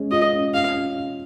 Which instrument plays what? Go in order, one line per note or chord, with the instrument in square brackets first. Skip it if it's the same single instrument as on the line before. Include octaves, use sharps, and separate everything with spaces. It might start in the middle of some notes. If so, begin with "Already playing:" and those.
Already playing: [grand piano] G#3 C#4
[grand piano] F4 [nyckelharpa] D#5
[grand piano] C#4
[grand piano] C#4 [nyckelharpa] F5
[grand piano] C#4
C#4